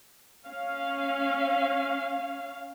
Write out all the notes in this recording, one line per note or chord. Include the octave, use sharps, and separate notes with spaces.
C#4 F5